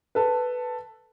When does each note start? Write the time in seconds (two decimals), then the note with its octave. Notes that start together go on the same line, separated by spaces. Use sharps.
0.15 A4 B4